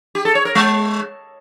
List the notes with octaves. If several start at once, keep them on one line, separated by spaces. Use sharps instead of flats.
G4
A4
C#5
A#4
G#3